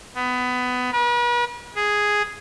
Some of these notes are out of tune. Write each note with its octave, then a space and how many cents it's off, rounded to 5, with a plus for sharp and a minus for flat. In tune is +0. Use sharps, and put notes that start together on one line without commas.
B3 +20
B4 -45
G#4 +0